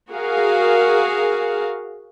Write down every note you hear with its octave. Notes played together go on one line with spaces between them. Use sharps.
F#4 G#4 A#4 F5